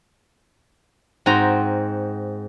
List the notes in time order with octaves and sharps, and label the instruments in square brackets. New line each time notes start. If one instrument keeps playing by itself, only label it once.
[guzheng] G#2 C4 F#4 G5 A#5